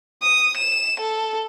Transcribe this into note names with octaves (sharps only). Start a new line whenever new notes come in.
D#6
E7
A4